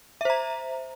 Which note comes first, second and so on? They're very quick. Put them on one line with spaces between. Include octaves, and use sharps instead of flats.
E5 C5 A#5